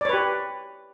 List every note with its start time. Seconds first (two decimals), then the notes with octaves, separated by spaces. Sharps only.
0.01 D5
0.05 C#5
0.09 B4
0.13 G4